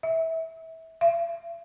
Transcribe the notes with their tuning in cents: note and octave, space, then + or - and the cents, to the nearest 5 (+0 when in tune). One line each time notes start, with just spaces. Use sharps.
E5 -25
E5 +45